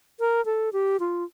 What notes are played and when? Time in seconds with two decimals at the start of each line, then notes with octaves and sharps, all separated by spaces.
0.20 A#4
0.45 A4
0.73 G4
1.00 F4